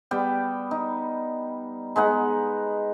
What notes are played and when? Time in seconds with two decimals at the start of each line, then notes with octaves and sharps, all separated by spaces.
0.11 G3 B3 D5 G5
0.71 D#4
1.96 G#3 B3 D#4 F#5